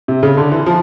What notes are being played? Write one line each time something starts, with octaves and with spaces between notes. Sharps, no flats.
C3
C#3
D3
E3
F3